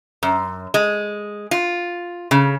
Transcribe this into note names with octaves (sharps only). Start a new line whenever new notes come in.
F#2
G#3
F4
C#3